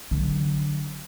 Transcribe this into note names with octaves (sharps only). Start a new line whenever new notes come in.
D3 F#3